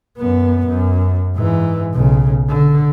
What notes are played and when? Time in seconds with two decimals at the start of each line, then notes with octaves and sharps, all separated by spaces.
0.18 F#2 B3
0.67 F#2
1.36 G#2 E3
1.94 B1 C#3
2.48 D3